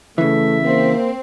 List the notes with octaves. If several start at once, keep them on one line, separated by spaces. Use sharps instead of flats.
C#3 E3 A3 E5
A#3 C4